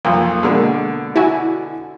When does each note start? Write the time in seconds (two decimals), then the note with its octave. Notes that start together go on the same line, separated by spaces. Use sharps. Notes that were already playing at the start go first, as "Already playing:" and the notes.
0.05 B1 F2 A#3
0.43 B2 D3 G#3 A#3
1.16 E4 F#4 G#5